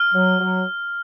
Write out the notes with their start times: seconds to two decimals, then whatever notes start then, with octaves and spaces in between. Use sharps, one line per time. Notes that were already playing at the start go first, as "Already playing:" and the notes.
Already playing: F6
0.13 F#3
0.40 F#3